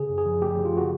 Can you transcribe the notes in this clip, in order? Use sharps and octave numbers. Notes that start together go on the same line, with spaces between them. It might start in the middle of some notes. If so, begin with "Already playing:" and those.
Already playing: C#3 G#4
F#2
G#4
F3
A3 G4
C#3
F4
F#4